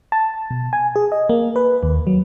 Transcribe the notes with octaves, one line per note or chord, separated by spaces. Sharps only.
A5
B2
G#5
G#4
D#5
A#3
B4
D#2
F#3